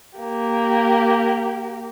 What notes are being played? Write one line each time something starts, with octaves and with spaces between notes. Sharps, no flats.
A#3 G4